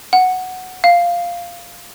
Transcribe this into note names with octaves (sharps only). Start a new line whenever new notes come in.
F#5
F5